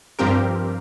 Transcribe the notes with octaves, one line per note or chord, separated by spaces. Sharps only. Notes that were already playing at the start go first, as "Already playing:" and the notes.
G2 F3 C4 G4 A#4